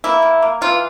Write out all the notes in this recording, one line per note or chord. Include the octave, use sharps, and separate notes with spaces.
A#3 E4
A#3
A#3
E3 F4